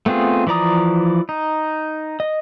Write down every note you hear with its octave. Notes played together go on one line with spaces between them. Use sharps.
A3 B3 C4 F4 G#4
E3 F3 D5 A#5 D#6
D#4
D#5